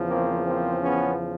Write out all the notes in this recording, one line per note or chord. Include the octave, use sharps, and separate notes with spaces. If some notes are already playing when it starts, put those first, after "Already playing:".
Already playing: E2 C#3 F3
A#3 C4
A#3 C4
B3 C#4